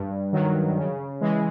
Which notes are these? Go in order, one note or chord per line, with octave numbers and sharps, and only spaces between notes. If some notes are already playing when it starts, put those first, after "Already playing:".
Already playing: G2
D#3 F#3
C#3
E3 G#3